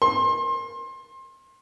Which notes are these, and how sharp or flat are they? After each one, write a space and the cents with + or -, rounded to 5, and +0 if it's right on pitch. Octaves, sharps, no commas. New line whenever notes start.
C6 +25